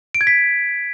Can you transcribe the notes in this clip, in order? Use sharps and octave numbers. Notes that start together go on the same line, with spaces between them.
D7
G#6
B6